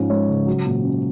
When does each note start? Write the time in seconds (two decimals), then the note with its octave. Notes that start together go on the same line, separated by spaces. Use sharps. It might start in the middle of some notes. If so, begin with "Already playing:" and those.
Already playing: G#2 F3 C#4
0.10 G#3 C#5
0.28 C#3
0.47 F#3
0.65 A#2
0.83 C#4